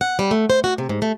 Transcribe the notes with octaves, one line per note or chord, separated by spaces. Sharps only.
F#5
G3
A3
C5
F#4
C3
G#2
A3